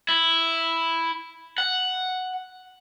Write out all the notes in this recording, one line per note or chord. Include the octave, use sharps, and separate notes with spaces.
E4
F#5